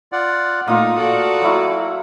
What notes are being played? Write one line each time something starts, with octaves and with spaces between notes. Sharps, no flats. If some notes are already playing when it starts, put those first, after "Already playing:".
F4 D5 F#5
A#2 A3 A#3 D#4 F4 D#6
F#4 A4 D5
F#3 E4